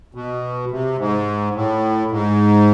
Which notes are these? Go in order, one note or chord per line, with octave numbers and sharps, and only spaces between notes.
B2
C3
G#2
A2
G#2